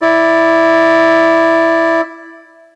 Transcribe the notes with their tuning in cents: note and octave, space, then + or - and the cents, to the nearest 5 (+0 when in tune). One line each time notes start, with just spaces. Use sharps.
E4 +0 D5 +0